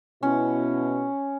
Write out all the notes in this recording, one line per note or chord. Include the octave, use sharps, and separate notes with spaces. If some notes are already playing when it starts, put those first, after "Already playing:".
B2 C#4 E4